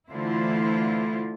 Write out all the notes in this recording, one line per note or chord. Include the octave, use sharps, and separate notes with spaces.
D3 E3 A3 E4 F4 C5